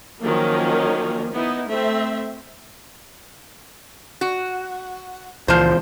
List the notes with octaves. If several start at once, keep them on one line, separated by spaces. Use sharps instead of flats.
D#3 F3 F#3 A#3 C#4
B3 D#4 E4
A3 C4 E5
F#4
C#2 A#2 E3 F3 C5